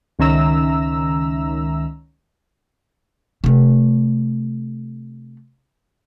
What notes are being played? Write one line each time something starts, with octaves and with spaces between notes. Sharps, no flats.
C#2 D#3 C#4 E5 A#5 E6
C3 A3